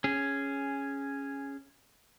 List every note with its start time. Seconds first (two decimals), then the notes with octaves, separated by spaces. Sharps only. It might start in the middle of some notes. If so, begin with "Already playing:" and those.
0.04 C#4 G#4